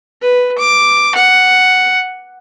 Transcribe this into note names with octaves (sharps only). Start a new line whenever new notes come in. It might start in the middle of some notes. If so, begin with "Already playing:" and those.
B4
D6
F#5